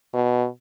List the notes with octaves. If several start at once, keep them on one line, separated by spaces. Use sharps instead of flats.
B2